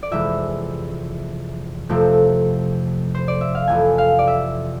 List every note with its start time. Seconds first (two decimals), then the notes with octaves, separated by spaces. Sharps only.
0.03 D5
0.11 F2 C3 E3 G#3 E5
1.89 F2 C3 F3 A3 C4
3.15 C5
3.28 D5
3.41 E5
3.55 F5
3.68 F2 C3 E3 A3 G#5
3.98 F5
4.19 D5
4.27 E5